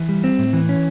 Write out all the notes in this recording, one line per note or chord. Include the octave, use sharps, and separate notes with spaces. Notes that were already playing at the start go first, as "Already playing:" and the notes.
Already playing: E3
G3
C4
A2
E3
C#4